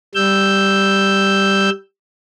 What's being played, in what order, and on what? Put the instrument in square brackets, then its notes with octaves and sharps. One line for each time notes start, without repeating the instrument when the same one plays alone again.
[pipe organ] G3 E6 G6